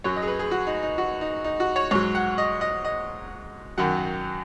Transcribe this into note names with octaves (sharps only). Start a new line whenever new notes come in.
F#2 F#3 C#5
D#5
G#4
B4
G#4
F#4
D#4
D#4
F#4
D#4
D#4
F#4
C#5
G#2 F#3 C#5
F#5
D#5
D#5
D#5
F#2 D#3 F#3 F#5